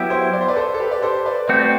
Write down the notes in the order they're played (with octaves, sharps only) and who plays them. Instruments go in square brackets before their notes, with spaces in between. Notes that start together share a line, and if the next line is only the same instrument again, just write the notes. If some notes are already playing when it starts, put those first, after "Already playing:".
Already playing: [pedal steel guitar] F#3 B3 E4 G4
[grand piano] C5 E5
D5
C5
B4 D5
A4 C5
A4
G4 B4
D5
A4 C5
B4 D5
[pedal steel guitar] A3 C4 F#4 [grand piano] B4 D5